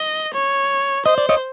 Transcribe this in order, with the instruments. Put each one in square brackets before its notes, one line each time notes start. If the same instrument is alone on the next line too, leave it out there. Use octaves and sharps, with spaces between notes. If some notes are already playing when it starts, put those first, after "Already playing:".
Already playing: [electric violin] D#5
C#5
[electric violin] C5 [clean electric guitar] D#5
[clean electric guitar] D5
C#5 D#5